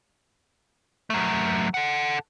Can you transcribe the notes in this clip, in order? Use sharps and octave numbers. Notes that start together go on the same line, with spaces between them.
F#3 A3
A4 F#5